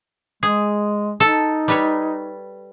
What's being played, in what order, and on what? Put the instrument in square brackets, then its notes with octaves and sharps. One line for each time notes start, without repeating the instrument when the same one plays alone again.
[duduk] G#3 [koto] G#4
[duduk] D#4 [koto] A4
[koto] G3 B4 C#5